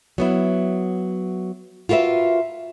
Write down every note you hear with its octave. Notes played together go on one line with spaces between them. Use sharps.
F#3 B3 E4
F4 F#4 A#4 B4 E5